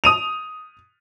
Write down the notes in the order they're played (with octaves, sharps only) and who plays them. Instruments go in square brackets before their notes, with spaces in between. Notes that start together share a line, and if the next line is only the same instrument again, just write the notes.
[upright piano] D#6 D#7 F7